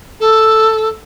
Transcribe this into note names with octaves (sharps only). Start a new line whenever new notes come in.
A4